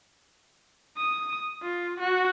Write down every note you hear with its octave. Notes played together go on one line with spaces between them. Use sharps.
D#6
F4
F#4